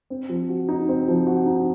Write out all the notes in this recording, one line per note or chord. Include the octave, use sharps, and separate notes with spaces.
C4
F3
F#4
D#4
C4
F3
F#4
D#4